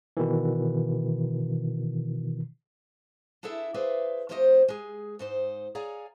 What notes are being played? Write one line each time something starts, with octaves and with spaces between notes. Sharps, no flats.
B2 D#3 E3
D4 E4 G#4 A4 E5
G#4 B4 C5 D5 E5 F5
F3 A3 C4 G4 C5 D#5
G#3 G#4
G#2 D#4 C5
G#4 C#5 D5 F5 G#5 A#5